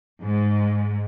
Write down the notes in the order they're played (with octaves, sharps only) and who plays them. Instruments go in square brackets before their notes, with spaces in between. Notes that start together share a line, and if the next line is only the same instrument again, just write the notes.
[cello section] G#2